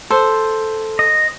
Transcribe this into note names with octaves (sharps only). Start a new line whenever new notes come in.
A4 C5
D#5